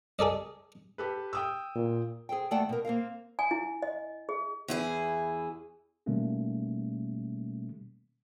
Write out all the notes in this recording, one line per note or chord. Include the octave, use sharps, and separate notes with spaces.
G#4 A4 D5 D#5
G4 A4 B4
G5 D#6 E6
A#2
G#4 A4 C5 G5
D#2 A3 D5 F#5 G5 A5
B2 A#4
A#3 C4 A#4 F5
G#5
E4
D#5
G#4
E2 E4 G#4
B2 D#3 G3 A3 A#3 C#4